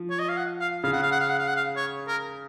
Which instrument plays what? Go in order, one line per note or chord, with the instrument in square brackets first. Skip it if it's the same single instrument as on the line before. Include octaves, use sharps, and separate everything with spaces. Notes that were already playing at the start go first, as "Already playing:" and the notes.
Already playing: [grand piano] F3
[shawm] C#5
D#5
F5
F#5
F5
[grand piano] C#3 [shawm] F5
[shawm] F#5
F5
F#5
F5
F#5
F5
F#5
F5
C#5
A#4